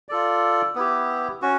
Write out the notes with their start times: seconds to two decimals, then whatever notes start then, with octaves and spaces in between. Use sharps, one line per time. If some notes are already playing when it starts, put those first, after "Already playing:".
0.09 F4 A4 D5
0.75 B3 E4 G4
1.42 C#4 F#4